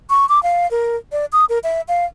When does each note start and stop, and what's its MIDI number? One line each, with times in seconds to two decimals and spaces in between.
0.10 0.28 85
0.29 0.42 86
0.43 0.69 77
0.71 0.96 70
1.12 1.25 74
1.32 1.45 87
1.49 1.58 70
1.64 1.81 76
1.88 2.05 77